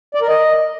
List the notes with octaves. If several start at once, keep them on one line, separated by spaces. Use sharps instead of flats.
D5
A#4
D#5